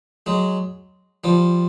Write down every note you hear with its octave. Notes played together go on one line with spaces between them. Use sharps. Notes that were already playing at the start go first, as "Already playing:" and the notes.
F#3 G#3
F3 G3